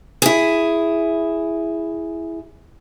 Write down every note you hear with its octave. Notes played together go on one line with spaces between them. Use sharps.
E4 G#4